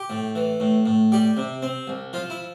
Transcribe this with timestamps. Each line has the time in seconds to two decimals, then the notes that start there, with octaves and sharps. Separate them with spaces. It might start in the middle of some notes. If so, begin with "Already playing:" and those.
Already playing: G4
0.10 A2
0.36 E3
0.60 A2
0.86 A2
1.12 G3 G4
1.37 C3
1.62 C4
1.87 C2
2.13 F3 F4
2.30 E4